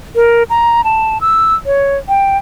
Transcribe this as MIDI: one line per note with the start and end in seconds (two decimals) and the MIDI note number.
0.15 0.43 70
0.50 0.84 82
0.84 1.18 81
1.21 1.55 88
1.66 1.97 73
2.08 2.37 79